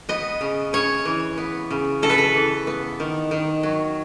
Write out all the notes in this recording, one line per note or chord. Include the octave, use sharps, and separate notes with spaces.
B3 D#5
C#3
C#3 C#5
E3
B3
C#3
C#3 A4
B4
A4
E3
B3
D#3
D#3
F#3